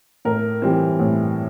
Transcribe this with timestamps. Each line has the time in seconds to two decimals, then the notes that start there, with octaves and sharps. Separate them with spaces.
0.25 A2 A#4
0.62 E3 G3 C4
0.99 A2